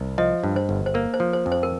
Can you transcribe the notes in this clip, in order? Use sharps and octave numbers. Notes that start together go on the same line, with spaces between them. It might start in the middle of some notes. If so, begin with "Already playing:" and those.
Already playing: C2
F3 D#5
G2
C5
G1
C5
A#3 A#4
C5
F3
C5
F2
C5
A#4